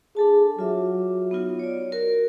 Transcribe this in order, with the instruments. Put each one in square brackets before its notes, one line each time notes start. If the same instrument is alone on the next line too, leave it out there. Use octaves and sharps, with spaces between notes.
[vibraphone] D4 A4 A5 [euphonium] G#4
[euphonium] F#3 [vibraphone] F4 E5 D6
[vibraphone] B3 D#4 F4
C#5 D5
F#4 A#4